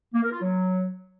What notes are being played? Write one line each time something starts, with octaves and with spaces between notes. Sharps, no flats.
A#3
A#4
F4
F#3